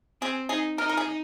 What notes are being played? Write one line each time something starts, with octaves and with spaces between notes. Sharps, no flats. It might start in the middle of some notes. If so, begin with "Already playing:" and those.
C4 G#4
D#4 G#4
D#4 A#4
A#4
G#4